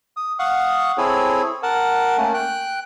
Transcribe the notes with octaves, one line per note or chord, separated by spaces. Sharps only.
D#6
F5 F#5 C#6 D#6
C4 E4 G#4 A4 C#5
A#4 F#5 A5
A3 A#3 C#4
G5 F#6